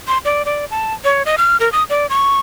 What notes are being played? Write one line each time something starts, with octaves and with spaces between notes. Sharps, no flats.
C6
D5
D5
A5
C#5
D#5
F6
A#4
D#6
D5
C#6